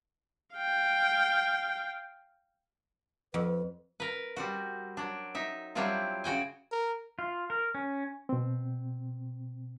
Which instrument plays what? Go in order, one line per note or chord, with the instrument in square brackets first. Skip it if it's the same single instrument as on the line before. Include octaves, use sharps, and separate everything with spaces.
[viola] F5 G5
[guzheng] F2 [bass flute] B4
[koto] A#4 B4
G3 C4 F#4
F#3 D4
D#4 E5
F#3 G3 C4 D4 E4 F4
C#3 F#4 G5 G#5
[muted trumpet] A#4
[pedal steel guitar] F4
A#4
C#4
[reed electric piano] B2 C4